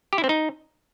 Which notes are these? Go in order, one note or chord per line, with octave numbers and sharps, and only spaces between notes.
G4
E4
C4
D#4